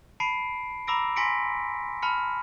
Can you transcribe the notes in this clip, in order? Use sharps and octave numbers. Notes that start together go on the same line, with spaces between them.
A5 B5 C7 D7
A#5 B5 D6 E6 A#6 D7
G#5 C6 A#6 B6 C#7 D7
A5 B5 F6 C#7